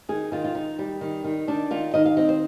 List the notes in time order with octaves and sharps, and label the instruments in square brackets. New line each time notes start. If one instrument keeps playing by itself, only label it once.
[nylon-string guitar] D#3 G#4
D#3 F4
F4
D#3 D#4
G3
D#3
D#3
D#3 D4
D#3 F4
D#3 D#5
F5
C4 D#5
C5